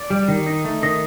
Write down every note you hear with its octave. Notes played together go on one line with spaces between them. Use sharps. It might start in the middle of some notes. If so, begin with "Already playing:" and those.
Already playing: D5
G3
D#3
D#4
A3
D#3 D#5